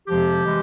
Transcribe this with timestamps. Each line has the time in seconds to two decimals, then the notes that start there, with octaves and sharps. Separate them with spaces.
0.08 F2 C3 F3 G#3 G4
0.46 E3 G#3